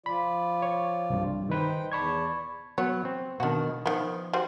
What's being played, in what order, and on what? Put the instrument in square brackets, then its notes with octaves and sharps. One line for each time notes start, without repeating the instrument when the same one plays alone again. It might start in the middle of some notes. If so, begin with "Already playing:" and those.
[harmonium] F3 F4 D5 [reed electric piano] B5
[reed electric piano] C#5
C2 G2
[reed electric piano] D#3 B4 [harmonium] D#4 C5 G5
[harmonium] E2 D5 A5 [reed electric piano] B5 C#6 G#6
[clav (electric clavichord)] F#3 B3 [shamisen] C#5
[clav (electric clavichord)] C4
[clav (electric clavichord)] B2 D#3 [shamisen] D4 F#4
[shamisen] D#3 B3 [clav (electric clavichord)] F3
[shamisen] G3 F#4 C5